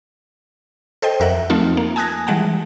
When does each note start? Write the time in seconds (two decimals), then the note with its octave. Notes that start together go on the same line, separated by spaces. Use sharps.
1.02 A4 C5 D#5 G5
1.20 F2 A#4 E5 F#5
1.50 F3 A3 C4 D#4 F4
1.77 A#3
1.96 G#5 A5 D#6 F#6 G#6 A#6
2.27 E3 G3 G#3 F#5 A5